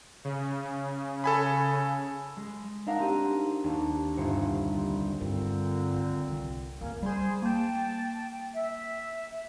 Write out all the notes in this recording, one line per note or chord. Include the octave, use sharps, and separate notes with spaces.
C#3
A4 G#5 B5
G#3
D4 D#4 A#4 F5 F#5
C4 G4 E6 D#7
D#2 D4 A4
G1 C2 C5 C#7
C4
G2 A#2 D3 C4
D#3
C2 F4
C#2 F#2 A#3 C#4
G3 G#4 C5 C6
A#3 G5 A5 G6
E5